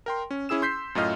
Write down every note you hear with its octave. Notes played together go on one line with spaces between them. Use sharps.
A#4 G5 C6
C#4
C#4 E4 G#4 E6 E7
C6 G6 B6 C7
F#2 A2 F4 D#5 F6